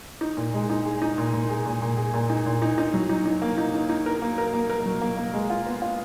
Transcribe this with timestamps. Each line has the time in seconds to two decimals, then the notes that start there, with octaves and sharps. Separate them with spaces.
0.21 D#4
0.37 A#2
0.54 G#3
0.70 D#4
0.85 G#4
1.02 D#4
1.18 A#2
1.33 A#2
1.50 G#4
1.66 A#2
1.82 A#2
1.97 G#4
2.14 A#2
2.30 D#4
2.46 A#2
2.62 D#4
2.78 D#4
2.94 F#3
3.09 D#4
3.25 D#4
3.42 A#3
3.58 D#4
3.74 D#4
3.89 D#4
4.06 A#4
4.22 A#3
4.38 A#4
4.54 A#3
4.70 A#4
4.86 F#3
5.02 A#3
5.18 A#3
5.34 G#3
5.50 F4
5.66 B3
5.82 F4